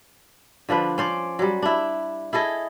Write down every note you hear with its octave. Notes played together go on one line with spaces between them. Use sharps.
D3 F3 D4 B4
C#4 C5 D5
F#3 G3
D4 E4
E4 G#4 A4 D#5